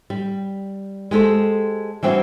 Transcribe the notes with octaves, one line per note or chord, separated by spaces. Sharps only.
G3
G#3 G4 A4 C5
E3 G3 C4 D4 E4 F#4